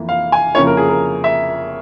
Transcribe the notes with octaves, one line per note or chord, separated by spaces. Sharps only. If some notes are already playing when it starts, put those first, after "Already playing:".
Already playing: F2 E3 A#3 E4
F5
G#5
F2 C#3 F3 A#3 E4 C#5
A#4
G#4
A#4
E5